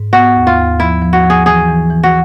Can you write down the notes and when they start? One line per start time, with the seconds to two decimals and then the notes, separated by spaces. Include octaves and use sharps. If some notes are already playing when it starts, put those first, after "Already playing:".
Already playing: G#2
0.13 B3 F#4
0.35 D#2
0.47 F4
0.58 D#2
0.80 F3 E4
1.02 F3
1.13 F#4
1.24 F3
1.30 G#4
1.46 E3 G#4
1.68 E3
1.90 E3
2.03 F#4